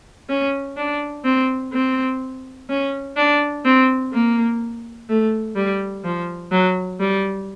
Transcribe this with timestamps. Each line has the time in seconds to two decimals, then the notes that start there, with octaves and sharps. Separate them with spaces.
0.29 C#4
0.77 D4
1.25 C4
1.72 C4
2.69 C#4
3.17 D4
3.65 C4
4.13 A#3
5.09 A3
5.56 G3
6.04 F3
6.52 F#3
7.00 G3